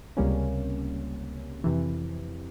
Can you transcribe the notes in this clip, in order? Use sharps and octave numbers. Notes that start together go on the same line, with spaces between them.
C#2 C3 G3 A#3 C#4
F2 C3 E3